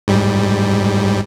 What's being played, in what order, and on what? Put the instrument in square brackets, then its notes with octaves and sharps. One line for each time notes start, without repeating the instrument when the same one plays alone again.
[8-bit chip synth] G#2 G3